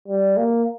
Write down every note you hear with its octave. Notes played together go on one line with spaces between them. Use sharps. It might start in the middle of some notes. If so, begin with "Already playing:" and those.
G3
A#3